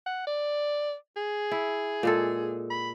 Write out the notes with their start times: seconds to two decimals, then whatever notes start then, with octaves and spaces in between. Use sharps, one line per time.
0.06 F#5
0.27 D5
1.16 G#4
1.51 E4
2.03 A#2 G#3 A4
2.70 B5